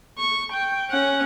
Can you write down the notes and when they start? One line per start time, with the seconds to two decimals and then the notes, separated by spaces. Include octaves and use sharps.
0.18 C#6
0.53 G5
0.90 C#4 F#5